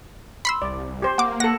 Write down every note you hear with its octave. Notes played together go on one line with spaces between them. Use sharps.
B5 C6 E6
C2 D5
G4 C5
A#3 F#5 D6
A4 F#5 A#6